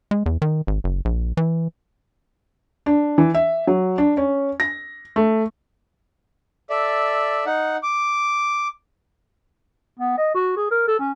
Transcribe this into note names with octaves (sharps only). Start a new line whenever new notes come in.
G#3
E2
D#3
G#1
F#1
A#1
E3
D4
E3
E5
F#3
D4
C#4
A#6
A3
A4 D5 E5
D#4 F#5
D6
B3
D#5
F#4
G#4
A#4
A4
C#4